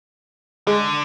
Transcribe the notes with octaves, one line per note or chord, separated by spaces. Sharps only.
D3 G#3